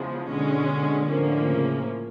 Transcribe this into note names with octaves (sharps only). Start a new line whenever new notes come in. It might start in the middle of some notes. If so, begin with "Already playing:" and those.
Already playing: E2 C#3 F3 G#3
B2 D3 G#3 C#4
D3
A2 D3 F3 A#3 C#4
C#3